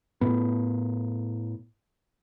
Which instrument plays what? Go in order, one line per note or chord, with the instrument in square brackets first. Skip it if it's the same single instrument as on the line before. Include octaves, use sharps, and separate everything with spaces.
[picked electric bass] A2 B3